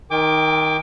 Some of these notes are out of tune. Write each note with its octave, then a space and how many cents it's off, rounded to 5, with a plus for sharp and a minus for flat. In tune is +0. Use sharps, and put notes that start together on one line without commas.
D#3 +10 G5 +40 D6 +0